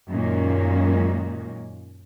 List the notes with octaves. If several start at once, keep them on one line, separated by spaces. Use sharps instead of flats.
F#2 A#2 D#3 G#3 A#3 C#4